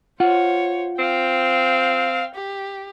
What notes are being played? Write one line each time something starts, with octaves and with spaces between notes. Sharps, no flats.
F4 C5 C#5 F#5
C4 F5 G5
G4